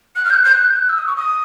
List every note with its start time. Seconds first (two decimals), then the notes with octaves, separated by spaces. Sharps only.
0.15 F#6
0.24 F6
0.29 G6
0.34 F#6
0.43 G6
0.53 F#6
0.64 G6
0.76 F#6
0.89 E6
0.97 D#6
1.07 C#6
1.16 D#6